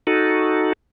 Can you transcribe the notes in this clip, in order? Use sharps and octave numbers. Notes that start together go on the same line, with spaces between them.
D#4 F#4 A4